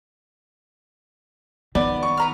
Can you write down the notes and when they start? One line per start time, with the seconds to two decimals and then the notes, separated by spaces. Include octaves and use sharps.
1.75 D#3 B3 D5
2.03 C#6
2.17 B4 A#5 F6